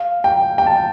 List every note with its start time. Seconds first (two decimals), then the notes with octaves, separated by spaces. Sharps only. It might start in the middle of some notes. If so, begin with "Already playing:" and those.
Already playing: F5
0.24 G5
0.58 G5
0.66 A5